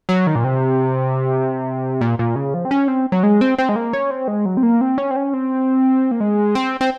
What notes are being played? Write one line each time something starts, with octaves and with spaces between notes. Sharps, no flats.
F#3
D#3
A#2
C3
A#2
A#2
C#3
F3
C4
C#4
C4
F#3
G#3
C4
C4
G#3
A#3
C#4
C4
G#3
F#3
C4
A#3
C4
C#4
C4
C#4
C4
A#3
G#3
C4
C4